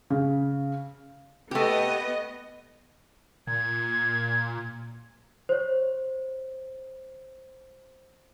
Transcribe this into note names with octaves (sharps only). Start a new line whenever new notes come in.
C#3
A3 B3 G4 D#5
A#2 G#6
C5 C#5